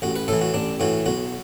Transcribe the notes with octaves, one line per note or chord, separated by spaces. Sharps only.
A1 F#4
B4
A2 E3 A4
F#4
A1 D4
A2 E3 F#4
B1 F#4